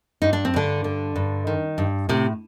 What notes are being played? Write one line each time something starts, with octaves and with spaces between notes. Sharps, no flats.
G2 D#4
D4
C4
G2 D3 D4
D3
G2
D#3
G2
A2 C3 C4